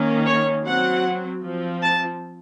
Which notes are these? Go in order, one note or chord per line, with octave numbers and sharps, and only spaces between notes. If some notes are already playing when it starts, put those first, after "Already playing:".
Already playing: D#3 A#3 C#4
C#5
F#3 C4 F#5
F3 C4
A5